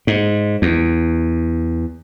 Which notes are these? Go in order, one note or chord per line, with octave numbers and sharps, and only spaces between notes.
G#2
E2